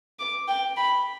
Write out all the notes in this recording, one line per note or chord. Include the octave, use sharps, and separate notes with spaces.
D6
G5
B5